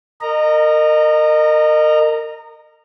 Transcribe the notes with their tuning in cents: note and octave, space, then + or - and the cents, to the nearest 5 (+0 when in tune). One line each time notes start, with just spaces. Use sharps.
A#4 -25 D#5 -25 A#5 +0